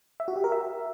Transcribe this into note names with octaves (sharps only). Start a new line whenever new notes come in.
E5
F#4
G4
A#4
E5